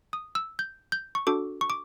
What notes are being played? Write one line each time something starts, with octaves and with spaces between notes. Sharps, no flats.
D#6
E6
G6
G6
C#6
D4 F#4 A4 D6
C#6
D6